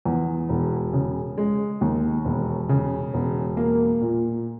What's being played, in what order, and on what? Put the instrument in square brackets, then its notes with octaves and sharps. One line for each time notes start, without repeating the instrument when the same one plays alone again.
[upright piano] E2
E1
C#3
G#3
D#2
E1
C#3
E1
A#3
A#2